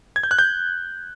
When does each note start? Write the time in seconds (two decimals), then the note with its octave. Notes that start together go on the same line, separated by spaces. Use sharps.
0.16 G#6
0.23 G6
0.31 F#6
0.39 G6